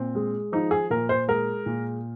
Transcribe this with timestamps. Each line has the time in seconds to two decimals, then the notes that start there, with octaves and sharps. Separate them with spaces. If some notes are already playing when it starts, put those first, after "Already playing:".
Already playing: A#2 C4
0.15 G#3
0.52 F3 D#4
0.71 G#4
0.90 A#2 A#4
1.09 C5
1.28 G#3 A#4
1.66 A#2